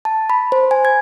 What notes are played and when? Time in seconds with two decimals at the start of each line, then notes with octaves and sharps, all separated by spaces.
0.05 A5
0.30 B5
0.52 C5
0.71 G#5
0.85 G#6